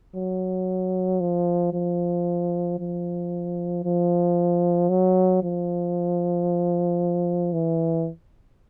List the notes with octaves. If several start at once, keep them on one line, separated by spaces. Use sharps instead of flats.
F#3
F3
F3
F3
F3
F#3
F3
E3